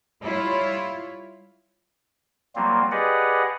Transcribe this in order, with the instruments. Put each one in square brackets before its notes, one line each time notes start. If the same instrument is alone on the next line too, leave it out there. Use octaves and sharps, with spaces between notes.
[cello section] G3 E4 F4 C#5
[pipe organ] F#3 G3 A#3 C4 F4
G4 G#4 B4 D5 D#5 F#5